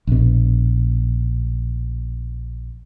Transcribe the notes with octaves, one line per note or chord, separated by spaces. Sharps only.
A#1 B2